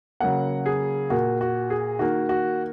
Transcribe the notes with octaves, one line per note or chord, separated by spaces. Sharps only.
C#3 F#3 A#3 F#5
G#4
A#2 A#3 F#4
F#4
G#4
D#3 A#3 F#4
F#4